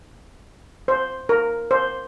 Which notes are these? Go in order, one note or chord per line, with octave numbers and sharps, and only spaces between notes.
C5
A#4
C5